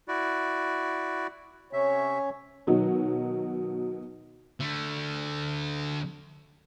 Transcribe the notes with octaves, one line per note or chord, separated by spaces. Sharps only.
E4 F#4 D5
C3 C#4 C#5 E5
B2 D#3 F#3 D#4 F#4
D3 A3